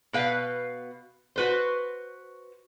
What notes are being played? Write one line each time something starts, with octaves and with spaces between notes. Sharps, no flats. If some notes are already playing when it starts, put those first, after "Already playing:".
B2 B4 F5
F#4 B4 C5